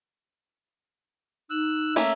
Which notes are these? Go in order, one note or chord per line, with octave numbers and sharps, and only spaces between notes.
D#4 E6 F#6
A3 A#3 C#4 E5